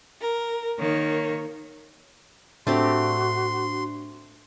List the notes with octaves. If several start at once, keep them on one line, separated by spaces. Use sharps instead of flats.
A#4
D#3 A#3 C#5
A2 A3 C4 D4 F#4 G4 C6